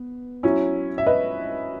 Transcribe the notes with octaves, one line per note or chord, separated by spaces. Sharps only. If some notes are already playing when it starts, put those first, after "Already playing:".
Already playing: B3
F#3 C#4 E4
E5
B4 D#5